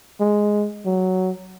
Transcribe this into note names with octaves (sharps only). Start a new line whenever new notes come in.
G#3
F#3